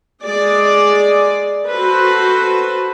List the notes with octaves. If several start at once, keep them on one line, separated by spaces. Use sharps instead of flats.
G#3 G#4 D5
F#4 A4 B4 C5